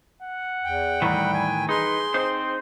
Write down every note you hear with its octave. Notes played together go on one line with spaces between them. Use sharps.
F#5
E2 G5
A2 D#3 E3 G3
G#5
D#4 G#4 B4 C6
C4 D#4 C5